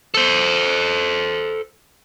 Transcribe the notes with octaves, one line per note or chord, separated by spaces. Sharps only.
A4 C5